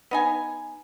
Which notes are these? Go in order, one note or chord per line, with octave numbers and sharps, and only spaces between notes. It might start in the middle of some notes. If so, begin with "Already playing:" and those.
B3 D#4 G#5